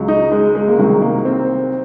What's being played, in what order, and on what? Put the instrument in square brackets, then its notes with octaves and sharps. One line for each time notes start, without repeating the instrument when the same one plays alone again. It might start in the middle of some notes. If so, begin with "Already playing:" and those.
Already playing: [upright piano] C#2 C#3 F#3
D#4
G#3
G#3
A#3
C2 C3 D#3 F#3 G#3
A#3
C4